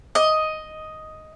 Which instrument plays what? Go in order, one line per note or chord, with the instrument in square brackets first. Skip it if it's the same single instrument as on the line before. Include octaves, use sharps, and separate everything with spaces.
[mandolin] D#5